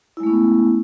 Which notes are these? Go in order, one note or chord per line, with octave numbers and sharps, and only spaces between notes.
G#3 A3 B3 C#4 E4